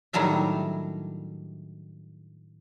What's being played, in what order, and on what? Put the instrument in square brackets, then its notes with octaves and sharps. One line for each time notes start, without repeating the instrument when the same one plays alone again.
[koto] A2 D#3 F#3 G3 D4 E5